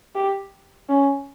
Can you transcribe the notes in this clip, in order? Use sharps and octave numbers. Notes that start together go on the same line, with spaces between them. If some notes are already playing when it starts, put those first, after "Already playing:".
G4
C#4